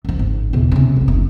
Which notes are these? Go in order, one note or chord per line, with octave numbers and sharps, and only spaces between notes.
F#2 F3
G#1
E2 B2
C3 C#4
F2 D#3
F#1